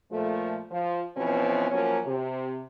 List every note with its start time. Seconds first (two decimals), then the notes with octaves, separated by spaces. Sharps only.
0.11 A#2 F3 A3
0.71 F3
1.17 B2 E3 F3 C4 C#4
1.71 F3 F#3 A#3 C#4
2.05 C3